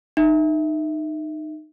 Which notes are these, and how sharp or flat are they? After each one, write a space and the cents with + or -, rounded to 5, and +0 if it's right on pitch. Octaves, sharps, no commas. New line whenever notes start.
D#4 -20 E5 +0